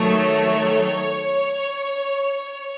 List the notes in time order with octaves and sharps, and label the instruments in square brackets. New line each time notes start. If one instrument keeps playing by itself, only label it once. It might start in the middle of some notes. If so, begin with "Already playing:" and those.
Already playing: [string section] D#3 F#3 A3 C#5